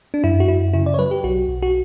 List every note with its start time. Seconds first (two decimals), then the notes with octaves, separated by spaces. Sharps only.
0.14 D4
0.24 F#2 E4
0.40 F#4
0.48 F#2 E4
0.73 C#3 E4
0.86 D5
0.94 C#5
0.98 F#3 B4
1.11 G4
1.24 B1 F#4
1.49 B1
1.63 F#4